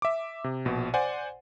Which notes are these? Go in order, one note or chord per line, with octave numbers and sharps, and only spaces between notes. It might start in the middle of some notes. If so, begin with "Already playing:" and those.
E5 D6
C3
A#1 B2
C5 D5 F#5 G#5